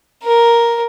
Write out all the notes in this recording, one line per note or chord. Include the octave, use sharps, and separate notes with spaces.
A#4